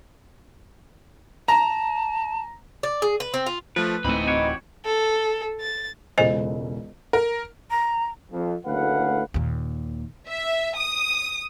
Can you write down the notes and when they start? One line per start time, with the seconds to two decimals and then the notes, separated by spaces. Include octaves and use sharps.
1.48 A5 A#5
2.83 D5
3.02 G#4
3.20 B4
3.34 C4
3.46 F4
3.76 F3 A3 B4
4.05 D1 E3 A3 C4 D#4 D#5 B5
4.27 F#4 G4 C#5
4.85 A4
5.61 A6
6.18 E1 C#2 A4 C5 D#5 G#5
7.13 A#4
7.71 A#5
8.32 F2
8.66 F#1 D2 A2 B4 F5 F#5
9.34 D#2 A#2
10.29 E5
10.78 D#6